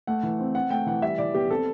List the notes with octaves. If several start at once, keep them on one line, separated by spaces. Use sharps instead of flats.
A3 F#5
E3
C4
C4 F#5
A3 G5
E3 F#5
G3 E5
E3 D5
B3 G4
C4 A4